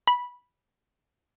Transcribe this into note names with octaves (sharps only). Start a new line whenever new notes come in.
B5